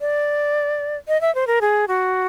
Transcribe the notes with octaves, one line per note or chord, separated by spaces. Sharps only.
D5
D#5
E5
C5
A#4
G#4
F#4